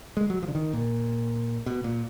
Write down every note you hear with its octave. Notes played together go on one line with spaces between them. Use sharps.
G#3
F#3
F3
D3
D#3
A#2
B2
A#2